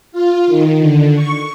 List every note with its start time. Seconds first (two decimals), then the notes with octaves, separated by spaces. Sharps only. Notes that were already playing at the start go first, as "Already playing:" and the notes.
0.12 F4
0.47 D#3
0.81 D3
1.14 C#6